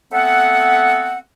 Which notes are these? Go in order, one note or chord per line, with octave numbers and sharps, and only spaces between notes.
A3 B3 C4 F#5